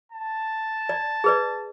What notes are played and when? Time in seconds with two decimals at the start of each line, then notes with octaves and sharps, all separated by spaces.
0.12 A5
0.89 D5
1.24 G#4 B4 D5